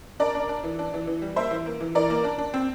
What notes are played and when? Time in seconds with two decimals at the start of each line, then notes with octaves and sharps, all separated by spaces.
0.20 D4 A#4 D5
0.35 D4
0.49 D4
0.64 E3
0.79 D4
0.94 E3
1.07 E3
1.22 G3
1.36 A#3 C5 E5
1.51 E3
1.66 A#3
1.81 E3
1.95 E3 A#4 D5
2.10 A#3
2.24 D4
2.38 D4
2.54 C4